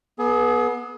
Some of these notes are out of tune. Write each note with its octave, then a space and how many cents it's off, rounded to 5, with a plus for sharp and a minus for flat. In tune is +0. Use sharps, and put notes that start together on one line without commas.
B3 -25 G#4 +35